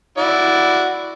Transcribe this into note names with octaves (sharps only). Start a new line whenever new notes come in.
E4 F#4 D5